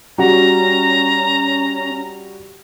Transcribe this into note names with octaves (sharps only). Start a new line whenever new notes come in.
G3 C#4 F#4 A#5